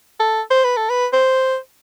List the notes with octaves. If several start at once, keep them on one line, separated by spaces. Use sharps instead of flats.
A4
C5
B4
A4
B4
C5